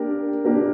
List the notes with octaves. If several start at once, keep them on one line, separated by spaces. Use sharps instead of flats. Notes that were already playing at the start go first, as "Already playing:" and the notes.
Already playing: A#3 D4 G4 A#4
A#3 D4 G4 A#4